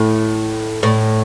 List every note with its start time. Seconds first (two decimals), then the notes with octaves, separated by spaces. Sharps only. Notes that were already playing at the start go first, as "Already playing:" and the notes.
Already playing: A2
0.83 A2